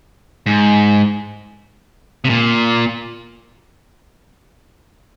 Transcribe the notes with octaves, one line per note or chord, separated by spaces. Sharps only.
G#2
C3
A#2